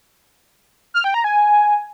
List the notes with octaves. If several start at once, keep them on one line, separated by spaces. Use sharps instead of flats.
F6
G5
A#5
G#5